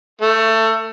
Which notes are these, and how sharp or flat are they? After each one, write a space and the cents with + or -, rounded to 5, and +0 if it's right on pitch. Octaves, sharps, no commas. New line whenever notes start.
A3 +20